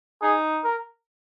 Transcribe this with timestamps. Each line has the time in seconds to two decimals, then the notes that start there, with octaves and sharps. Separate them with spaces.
0.22 D#4 G#4
0.64 A#4